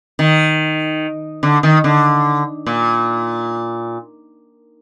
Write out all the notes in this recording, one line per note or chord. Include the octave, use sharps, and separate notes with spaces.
D#3
D3
D#3
D3
A#2